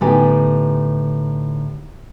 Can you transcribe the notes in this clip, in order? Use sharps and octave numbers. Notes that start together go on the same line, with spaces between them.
A2 D3 B3 D#4 G4 G#5